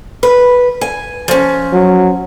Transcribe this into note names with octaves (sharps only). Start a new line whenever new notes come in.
B4
G#5
F3 C#4
F#3